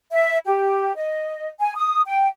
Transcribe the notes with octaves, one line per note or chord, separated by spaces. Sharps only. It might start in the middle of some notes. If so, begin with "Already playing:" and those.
E5
G4
D#5
G#5
D#6
G5